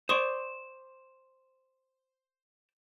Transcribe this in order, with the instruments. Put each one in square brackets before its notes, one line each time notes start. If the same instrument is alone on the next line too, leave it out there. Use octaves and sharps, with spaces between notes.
[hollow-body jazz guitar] C5 D5 [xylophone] C6 C#6 D#6